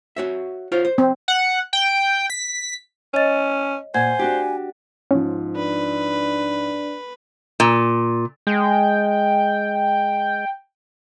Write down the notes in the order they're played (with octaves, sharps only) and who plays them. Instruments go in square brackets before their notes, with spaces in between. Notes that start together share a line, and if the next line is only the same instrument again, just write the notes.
[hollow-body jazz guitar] F#4 C#5 E5
F4 C5 C#5
C5
[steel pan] C4
[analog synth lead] F#5
G5
B6
[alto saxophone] C#4 [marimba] C#5 D#5 A6
[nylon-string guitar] A#2 [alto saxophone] C5 [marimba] F#5 G#6 [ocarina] G#5
[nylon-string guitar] D4 F#4 G4
[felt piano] G#2 F3 [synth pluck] C#4
[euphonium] D4 [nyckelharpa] B4
[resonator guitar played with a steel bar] A#2
[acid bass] G#3 [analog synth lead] G5